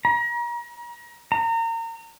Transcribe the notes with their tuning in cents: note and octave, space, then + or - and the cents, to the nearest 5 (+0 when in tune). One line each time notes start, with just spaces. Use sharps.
A#5 +35
A#5 -30